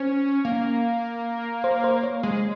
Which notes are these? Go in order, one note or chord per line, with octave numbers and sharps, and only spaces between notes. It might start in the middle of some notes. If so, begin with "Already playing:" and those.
Already playing: C#4 C5
A#3
C5
C5
C#5
G#3